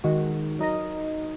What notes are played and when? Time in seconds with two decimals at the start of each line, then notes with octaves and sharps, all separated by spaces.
0.04 D#3 G#3 F#4
0.59 F#3 D#4 A#4 D#5